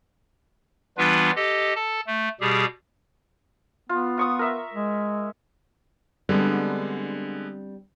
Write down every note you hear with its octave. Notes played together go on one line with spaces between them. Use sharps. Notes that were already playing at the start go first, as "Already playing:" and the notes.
E3 G3 B3 D4 F4 B4
G4 A4 D#5
A4 A5
A3
B2 G3 G4 G#4
B3 F4
F4 C#6 D#6
A#4 E5
G#3
D3 G3 G#3 B3 C4 D4